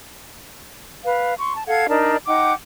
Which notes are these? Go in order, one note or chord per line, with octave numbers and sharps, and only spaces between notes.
B4 F5
C6 C#6
A5
A4 F5 F#5 G#6
D4 D#4 A#4 D5
D#4 F#5 G5 D6